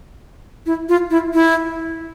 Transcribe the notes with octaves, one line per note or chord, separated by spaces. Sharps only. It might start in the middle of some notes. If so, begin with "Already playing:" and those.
E4
F4
E4
E4